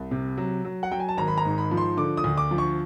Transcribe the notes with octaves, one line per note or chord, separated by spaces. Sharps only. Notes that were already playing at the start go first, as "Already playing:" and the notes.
Already playing: C2
C3
F#3
F#3
F#5
F#3 G5
G#5
A5
G#1 A#5
B5
A#5
G#2
B5
F3
C6
D3 D6
D#6
D2
D6
F3
C#6